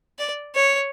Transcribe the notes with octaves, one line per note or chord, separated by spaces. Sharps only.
D5
C#5